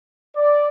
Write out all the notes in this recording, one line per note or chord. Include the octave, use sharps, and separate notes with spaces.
D5